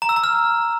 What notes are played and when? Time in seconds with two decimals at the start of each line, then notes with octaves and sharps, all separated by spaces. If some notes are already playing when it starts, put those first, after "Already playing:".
0.02 A#5
0.09 E6
0.16 A#5
0.24 F6